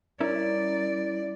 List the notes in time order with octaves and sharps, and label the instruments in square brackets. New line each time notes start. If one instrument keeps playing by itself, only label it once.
[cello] G3 D5 [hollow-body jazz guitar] C#4 E4 A#4